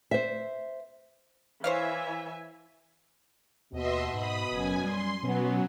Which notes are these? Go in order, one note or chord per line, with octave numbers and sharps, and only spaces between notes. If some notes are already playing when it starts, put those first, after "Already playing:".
C5 E5
E3 C5 C#5 E5 F5 G#5
D#2 B2 D#5 E5 C6
G#2 B5 D#6
F#1 F#2 G#5
G3 C6
B2 F#3 B3 C#4